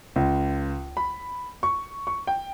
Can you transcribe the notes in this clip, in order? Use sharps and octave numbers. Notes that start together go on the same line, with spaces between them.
C#2
B5
C#6
C#6
G5